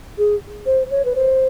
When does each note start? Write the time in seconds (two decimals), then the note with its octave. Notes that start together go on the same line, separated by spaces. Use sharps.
0.18 G#4
0.66 C5
0.91 C#5
1.05 B4
1.16 C5